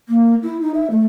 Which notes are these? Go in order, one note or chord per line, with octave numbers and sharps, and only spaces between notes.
A#3
E4
D#4
E5
A3